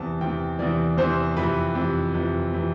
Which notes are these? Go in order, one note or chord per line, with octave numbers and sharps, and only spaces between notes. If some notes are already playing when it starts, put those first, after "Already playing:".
Already playing: E2 C3 E3 A5
E2 C3 E3 G5
E2 C3 E3 D5
E2 C3 E3 C5
F2 C3 E3 B4
F2 C3 E3
F2 C3 E3
C3 E3